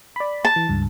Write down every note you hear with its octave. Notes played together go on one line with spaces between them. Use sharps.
D5 B5
A5
E3
C#2 G2